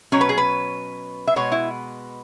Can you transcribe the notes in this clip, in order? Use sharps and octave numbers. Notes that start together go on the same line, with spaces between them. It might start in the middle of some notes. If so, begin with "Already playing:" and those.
B2 F#3 C#4 C#5
B4
G#4
B4
E5
B2 G#3 B3 C#5
E4